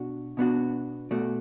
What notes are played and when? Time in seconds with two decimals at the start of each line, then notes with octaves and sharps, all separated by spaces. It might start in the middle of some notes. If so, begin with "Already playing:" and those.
Already playing: B2 D4 F#4
0.37 B2 B3 D4 F#4
1.11 B2 A3 F#4 D5